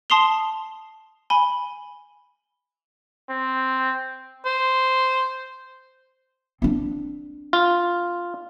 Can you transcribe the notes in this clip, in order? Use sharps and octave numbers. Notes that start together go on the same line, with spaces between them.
A5 C6 D#6 C7 F7 G7
G#5 B5 G7
C4
C5
C4 D4
F4